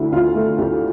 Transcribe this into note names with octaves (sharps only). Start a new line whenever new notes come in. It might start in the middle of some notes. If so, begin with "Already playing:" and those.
Already playing: D2 D3 E4
D2 F4
A3
D2 G4